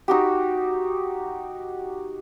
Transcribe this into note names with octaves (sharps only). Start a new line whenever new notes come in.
D#4 F#4 G4